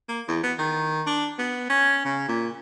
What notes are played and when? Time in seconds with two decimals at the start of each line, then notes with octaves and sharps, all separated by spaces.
0.09 A#3
0.28 E2
0.43 B3
0.59 D#3
1.07 D4
1.39 B3
1.70 C#4
2.05 C#3
2.28 A#2